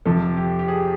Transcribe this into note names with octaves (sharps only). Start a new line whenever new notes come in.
F2 C3 F3 A4
G4
G4
G#4